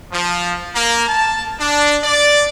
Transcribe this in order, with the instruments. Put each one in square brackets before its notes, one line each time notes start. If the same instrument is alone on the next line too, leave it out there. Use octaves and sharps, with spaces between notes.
[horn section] F3
A#3
A5
D4
D5